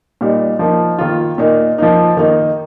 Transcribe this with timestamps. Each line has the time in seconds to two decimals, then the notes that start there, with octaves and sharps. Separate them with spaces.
0.21 A#2 G3 D#4
0.59 F3 A#3 D#4
0.98 D#3 A#3 F4
1.38 A#2 A#3 D#4
1.78 F3 A#3 D#4
2.17 D#3 A#3 D#4